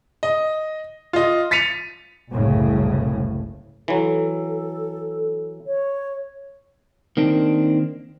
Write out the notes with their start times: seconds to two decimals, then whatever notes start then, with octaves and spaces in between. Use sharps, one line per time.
0.23 D#5
1.13 F4 D#5
1.51 A6 B6 C#7 D#7 F7
2.31 F#1 C2 A2 C#3
3.88 E3 F#3 A4
5.67 C#5
7.17 D#3 A#3 C4 D4